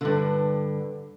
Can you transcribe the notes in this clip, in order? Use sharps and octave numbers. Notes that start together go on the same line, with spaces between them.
G2 D3